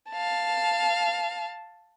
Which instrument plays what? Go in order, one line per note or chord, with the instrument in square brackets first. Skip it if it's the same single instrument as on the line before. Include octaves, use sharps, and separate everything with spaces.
[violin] F5 A5